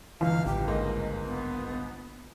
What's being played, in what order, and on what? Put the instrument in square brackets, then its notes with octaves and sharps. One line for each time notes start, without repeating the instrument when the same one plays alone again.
[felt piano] G1 C#2 [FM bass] E3 [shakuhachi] F5
[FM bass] A1 [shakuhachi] G4
[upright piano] G#2 A#3 [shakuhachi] D#5
[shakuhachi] B3